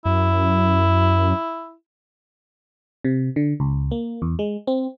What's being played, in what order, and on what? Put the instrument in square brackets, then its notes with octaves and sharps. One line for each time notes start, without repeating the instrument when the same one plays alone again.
[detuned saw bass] F#2 [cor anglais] E4
[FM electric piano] C3
D3
C#2
A#3
E2
G#3
C4